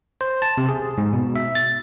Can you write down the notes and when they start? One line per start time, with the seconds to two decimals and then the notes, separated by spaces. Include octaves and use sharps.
0.21 C5
0.42 A5
0.58 C3
0.69 G#4
0.98 G#2
1.13 B2
1.36 E5
1.55 A6